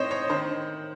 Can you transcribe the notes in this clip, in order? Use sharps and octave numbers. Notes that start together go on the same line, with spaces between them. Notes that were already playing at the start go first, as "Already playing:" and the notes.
Already playing: A2 C4 D#4 C5 C#5 D#5
C#5
D#3 C5